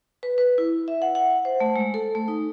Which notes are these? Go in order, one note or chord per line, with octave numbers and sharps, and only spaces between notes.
B4
B4
E4
E5
F#5
F#5
C5
A3
G#3
A4
A3
D#4